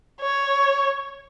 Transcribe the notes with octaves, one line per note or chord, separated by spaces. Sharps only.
C#5